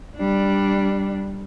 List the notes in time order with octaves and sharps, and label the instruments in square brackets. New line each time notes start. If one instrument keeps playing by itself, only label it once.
[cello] G3 D4